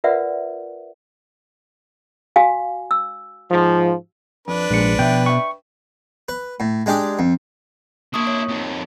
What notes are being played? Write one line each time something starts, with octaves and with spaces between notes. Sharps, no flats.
F4 A#4 B4 D5 E5 F#5
F#4 F5 G#5
E6
G#2 F3
F2 D4 B4
A#1 G#2 G#3 C#7
B2 F3 E5 G5
E5 G5 C#6
B4
A2
G#3 D4 G4 G#4
F2
A#3 D4 E4 C#6 D#6
C#5
F2 D#3